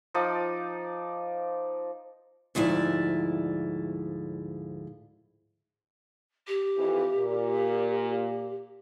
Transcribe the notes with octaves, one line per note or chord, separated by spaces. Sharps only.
F3 D#4 D5
D2 G#2 F3 E4 D5
G4
F2 E3
A#2